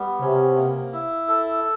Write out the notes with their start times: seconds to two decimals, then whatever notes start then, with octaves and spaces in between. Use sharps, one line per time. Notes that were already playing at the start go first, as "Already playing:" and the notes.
Already playing: G3 B3
0.21 C3 C#4
0.56 A#3
0.93 E4
1.28 A4